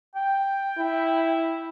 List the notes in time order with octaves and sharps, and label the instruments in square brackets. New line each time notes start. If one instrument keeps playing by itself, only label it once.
[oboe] G5
[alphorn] E4